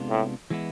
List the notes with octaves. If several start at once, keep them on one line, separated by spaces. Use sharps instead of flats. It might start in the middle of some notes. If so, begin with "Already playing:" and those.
Already playing: C3 G#3 B3 D4 F4
A2
E3 G#3 B3 E4